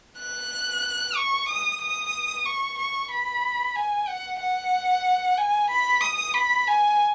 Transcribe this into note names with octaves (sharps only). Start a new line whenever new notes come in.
F#6
C#6
D#6
D#6
C#6
C#6
B5
G#5
F#5
F#5
G#5
B5
D#6
B5
G#5